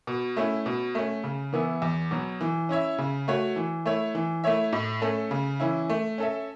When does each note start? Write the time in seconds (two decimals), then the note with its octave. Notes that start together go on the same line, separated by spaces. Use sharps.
0.07 B2
0.37 A3 C#4 E4
0.66 B2
0.95 A3 C#4
1.24 C#3
1.53 E3 B3 E4
1.82 E2
2.11 B2 F#3
2.41 E3
2.69 C#4 E4 C#5 E5
2.98 C#3
3.28 A3 F#4 C#5
3.56 E3
3.86 A3 E4 C#5
4.15 E3
4.44 A3 E4 C#5 E5
4.73 A2
5.02 A3 C#4 A4
5.31 C#3
5.60 E3 C#4 E4
5.89 A3
6.18 C#4 A4 E5